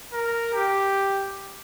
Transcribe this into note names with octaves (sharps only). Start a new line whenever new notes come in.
A#4
G4